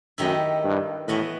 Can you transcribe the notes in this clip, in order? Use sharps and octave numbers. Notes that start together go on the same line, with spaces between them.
F#2 D#3 A3 E4 G4 D#5
G2
A2 E3 B3 F#4 B4 D#5